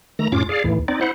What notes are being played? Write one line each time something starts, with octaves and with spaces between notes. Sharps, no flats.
D#3 A3 A#5
F#2 A2 C#4 F4 D6
G#4 D5 F5
D#2 A2 E3
C4 D#4 D5
E4 C5 F#5